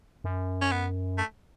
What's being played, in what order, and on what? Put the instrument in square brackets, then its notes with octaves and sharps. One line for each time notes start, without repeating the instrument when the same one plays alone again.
[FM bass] F#2
[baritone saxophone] C#4
B3
A3